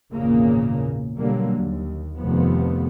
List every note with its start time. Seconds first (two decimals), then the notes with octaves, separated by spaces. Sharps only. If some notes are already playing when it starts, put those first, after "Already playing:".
0.12 G#1 E2 A#2 C#3 A#3
1.18 B2 D3 F#3 G3 A#3
1.57 D#2
2.19 F1 F2 C3 D#3 F3 B3